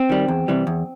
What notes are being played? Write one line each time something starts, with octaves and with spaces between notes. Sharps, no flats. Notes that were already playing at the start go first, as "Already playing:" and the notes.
Already playing: C4
D#3 G3
E2
C3 E3 G3
E2